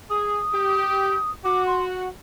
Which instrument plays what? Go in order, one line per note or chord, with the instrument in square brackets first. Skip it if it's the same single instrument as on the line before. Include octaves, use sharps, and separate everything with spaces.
[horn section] G#4 [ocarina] D#6
[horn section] G4
[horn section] F#4 [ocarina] D6
[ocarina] C6
F#5